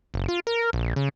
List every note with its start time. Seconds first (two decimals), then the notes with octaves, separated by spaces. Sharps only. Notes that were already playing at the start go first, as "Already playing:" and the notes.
0.14 F#1
0.28 F4
0.47 A#4
0.73 A#1
0.96 C#3